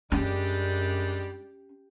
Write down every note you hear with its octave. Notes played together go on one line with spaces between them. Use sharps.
F#2 G3 G#3 C#4 D4 G4